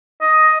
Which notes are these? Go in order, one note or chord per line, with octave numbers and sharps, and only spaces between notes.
D#5